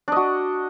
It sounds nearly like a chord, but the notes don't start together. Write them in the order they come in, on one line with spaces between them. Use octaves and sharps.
D4 D#5 F#4